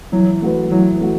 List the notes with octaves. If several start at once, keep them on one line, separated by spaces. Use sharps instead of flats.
E3 F#3
A3 F#4 B4
E3 F#3
A3 F#4